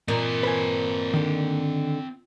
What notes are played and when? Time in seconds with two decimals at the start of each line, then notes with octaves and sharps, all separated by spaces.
0.08 A#2 C4 D#5
0.43 B4 C5 G#5
1.14 D3 D#3